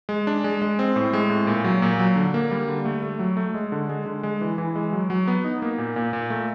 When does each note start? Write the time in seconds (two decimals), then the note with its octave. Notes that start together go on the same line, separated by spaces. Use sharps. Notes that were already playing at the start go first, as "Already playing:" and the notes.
0.09 G#3
0.27 D4
0.44 G#3
0.62 G#3
0.79 C4
0.96 A2
1.13 G#3
1.29 A2
1.47 A#2
1.64 F#3
1.82 A#2
1.99 F#3
2.16 D3
2.34 A#3
2.51 G3
2.68 D3
2.85 A3
3.03 A3
3.19 F#3
3.37 A3
3.54 G#3
3.72 D3
3.89 G#3
4.06 D3
4.23 G#3
4.41 E3
4.58 E3
4.76 G#3
4.93 F#3
5.10 F#3
5.28 B3
5.45 D#4
5.62 A#3
5.78 A#2
5.96 A#2
6.13 A#2
6.30 A3